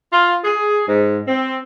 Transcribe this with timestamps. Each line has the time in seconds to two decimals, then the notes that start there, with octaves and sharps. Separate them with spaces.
0.12 F4
0.44 G#4
0.87 G#2
1.26 C4